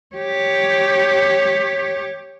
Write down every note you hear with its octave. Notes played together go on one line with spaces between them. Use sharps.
G4 C#5